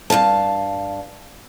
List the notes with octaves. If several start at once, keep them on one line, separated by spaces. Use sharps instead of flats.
G2 E3 F5 A5